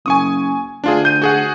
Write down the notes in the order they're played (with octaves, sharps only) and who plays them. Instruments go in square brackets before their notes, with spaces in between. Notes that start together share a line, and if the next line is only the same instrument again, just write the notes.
[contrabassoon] F#1 [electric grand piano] G#5 C#6 D#6
[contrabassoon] D2 [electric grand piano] D4 F4 G#4
[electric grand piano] G6 D#7
F#4 G#4 F#5